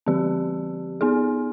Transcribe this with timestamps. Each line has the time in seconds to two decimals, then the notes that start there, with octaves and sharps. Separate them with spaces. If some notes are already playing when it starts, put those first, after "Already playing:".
0.06 D3 F3 C4 G4
1.01 B3 D#4 G#4